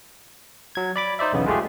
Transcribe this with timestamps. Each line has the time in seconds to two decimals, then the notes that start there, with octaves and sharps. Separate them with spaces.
0.75 F#3 G#6
0.96 D5 B5 D6
1.19 D#4 C5 D5 E5
1.33 B1 E2 C#3 B3
1.46 G#3 A3 F4 G4 G#4